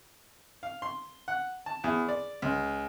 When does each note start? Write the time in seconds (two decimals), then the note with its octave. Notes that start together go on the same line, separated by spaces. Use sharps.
0.63 F5
0.82 C6
1.28 F#5
1.66 A5
1.84 E2
2.08 D5
2.42 C#2